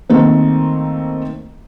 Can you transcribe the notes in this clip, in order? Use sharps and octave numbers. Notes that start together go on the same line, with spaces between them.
D#3 A3 A#3 C4